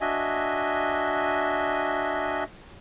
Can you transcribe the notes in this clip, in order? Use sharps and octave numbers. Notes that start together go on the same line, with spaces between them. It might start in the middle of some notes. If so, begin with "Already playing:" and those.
D4 F#4 D#5 E5 G#5